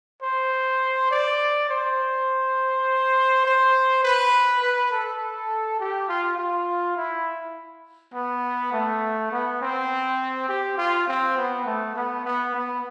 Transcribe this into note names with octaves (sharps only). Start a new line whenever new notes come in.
C5
D5
C5
C5
B4
B4
A4
G4
F4
F4
E4
B3
A3
B3
C4
G4
F4
C4
B3
A3
B3
B3
B3